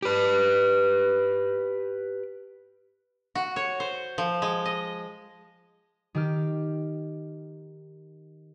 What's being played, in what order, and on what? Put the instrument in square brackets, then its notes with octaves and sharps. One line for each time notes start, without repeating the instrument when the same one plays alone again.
[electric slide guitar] G4 B4
[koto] F#4
C#5
C5
F3
G#3
D#5
[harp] D#3 G4 F6